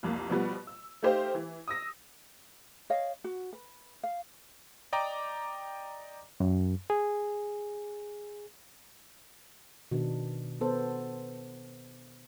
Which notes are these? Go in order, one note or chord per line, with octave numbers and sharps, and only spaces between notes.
C2 F2 A#3
B2 F3 G3 B3
E6
A3 D#4 G4 C5 F5
E3
D#6 E6 A#6
C#5 D#5 F5
F#4
B4
F5
D5 D#5 G5 A#5 D6
F#2
G#4
B2 D#3 D4
B3 A4 C5